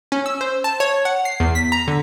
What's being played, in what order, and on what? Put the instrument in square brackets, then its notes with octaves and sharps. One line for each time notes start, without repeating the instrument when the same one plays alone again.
[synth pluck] C#4
E6
C5
A5
C#5
F#5
C7
E2
B6
A#5
D3